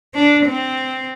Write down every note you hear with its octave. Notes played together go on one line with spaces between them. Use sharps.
D4
C4